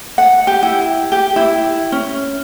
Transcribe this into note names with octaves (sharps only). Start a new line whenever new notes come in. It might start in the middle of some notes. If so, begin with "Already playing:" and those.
F#5
G4
E4
G4
E4
C#4